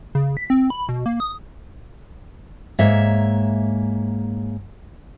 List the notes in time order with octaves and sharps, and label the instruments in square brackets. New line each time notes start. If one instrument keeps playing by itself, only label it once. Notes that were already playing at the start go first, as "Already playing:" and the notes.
[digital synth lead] C#3
B6
C4
B5
B2
A#3
D#6
[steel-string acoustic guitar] G#2 A#3 C#5 E5